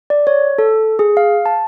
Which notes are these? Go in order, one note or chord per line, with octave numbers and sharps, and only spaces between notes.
D5
C#5
A4
G#4
F5
A5